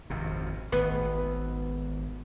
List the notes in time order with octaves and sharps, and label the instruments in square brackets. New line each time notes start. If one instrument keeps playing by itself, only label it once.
[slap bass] G#1 F2 C3
[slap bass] G#1 [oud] B3